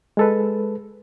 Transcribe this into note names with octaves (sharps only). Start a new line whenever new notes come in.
G#3 A4 B4